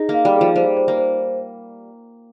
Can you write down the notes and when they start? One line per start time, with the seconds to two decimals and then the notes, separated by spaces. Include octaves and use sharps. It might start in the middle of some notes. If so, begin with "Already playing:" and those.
Already playing: D#4 G#4
0.09 A#3
0.14 F5
0.25 G3
0.36 G#4
0.41 F3
0.56 G3 C5
0.77 C5
0.88 A#3
0.98 C5